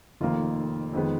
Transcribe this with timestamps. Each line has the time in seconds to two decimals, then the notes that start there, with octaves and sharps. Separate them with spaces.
0.20 F1 F2 D#3 A#3 F4
0.93 F2 D#3 G#3 B3